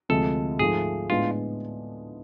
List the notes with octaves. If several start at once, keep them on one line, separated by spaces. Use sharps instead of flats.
D2 C3 F3 G#3 A4
G#2 F3 A3 G#4
A2 G#3 B3 D4 F4